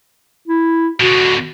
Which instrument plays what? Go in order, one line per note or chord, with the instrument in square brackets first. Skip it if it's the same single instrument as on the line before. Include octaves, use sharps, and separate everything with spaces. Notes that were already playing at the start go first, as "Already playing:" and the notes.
[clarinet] E4
[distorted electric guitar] B2 D3 [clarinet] F#4